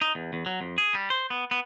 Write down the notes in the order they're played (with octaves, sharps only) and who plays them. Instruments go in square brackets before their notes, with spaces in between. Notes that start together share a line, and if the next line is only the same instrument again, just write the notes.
[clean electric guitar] D#4
E2
E2
F#3
F2
G#4
G3
C5
B3
B3